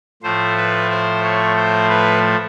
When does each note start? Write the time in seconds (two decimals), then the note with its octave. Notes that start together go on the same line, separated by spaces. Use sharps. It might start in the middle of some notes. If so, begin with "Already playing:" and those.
0.23 A2 F3 A3 C5
0.57 B4
0.90 C5
1.23 C#5
1.56 C5
1.89 B4